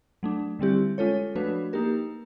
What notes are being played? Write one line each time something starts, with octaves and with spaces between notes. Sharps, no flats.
F#3 A3 D4
D3 G3 C4 E4 G4
G#3 C#4 F4 A4 C#5
F3 A3 D4 F#4 B4
A#3 D#4 G4 A#4